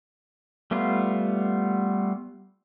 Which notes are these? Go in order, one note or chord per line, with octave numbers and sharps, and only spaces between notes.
G3 A3 B3 F4